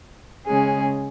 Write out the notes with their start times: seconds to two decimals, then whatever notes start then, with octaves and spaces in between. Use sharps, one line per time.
0.46 C#3 G#3 C#4 G#4